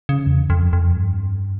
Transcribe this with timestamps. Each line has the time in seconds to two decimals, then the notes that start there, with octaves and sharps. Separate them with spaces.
0.09 C#3
0.27 E2
0.50 F2
0.73 F2
0.96 G2